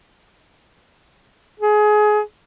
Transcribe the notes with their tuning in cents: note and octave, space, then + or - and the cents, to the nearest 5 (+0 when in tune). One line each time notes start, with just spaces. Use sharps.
G#4 +25